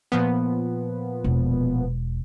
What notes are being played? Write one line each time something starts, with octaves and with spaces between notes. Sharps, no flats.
A#2 F3 B3
E1